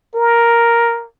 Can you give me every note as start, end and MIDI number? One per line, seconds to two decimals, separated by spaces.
0.15 1.05 70